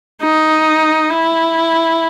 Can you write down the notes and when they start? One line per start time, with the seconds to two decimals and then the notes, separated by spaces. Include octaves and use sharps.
0.22 D#4
1.09 E4